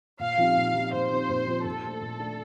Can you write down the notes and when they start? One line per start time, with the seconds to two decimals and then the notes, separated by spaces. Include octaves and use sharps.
0.19 A#2 F5
0.38 F3 C4 D#4 G4
0.56 A#2
0.74 F3 C4 D#4 G4
0.92 A#2 C5
1.11 F3 C4 D#4 G4
1.29 A#2
1.47 F3 C4 D#4 G4
1.65 A#2 A4
1.83 A3 D4
2.01 A#2
2.19 A3 D4